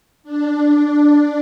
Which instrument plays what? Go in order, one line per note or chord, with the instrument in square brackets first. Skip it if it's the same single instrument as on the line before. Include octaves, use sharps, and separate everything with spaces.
[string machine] D4